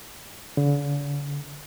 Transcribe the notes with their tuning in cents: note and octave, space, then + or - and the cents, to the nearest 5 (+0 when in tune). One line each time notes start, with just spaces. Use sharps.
D3 -45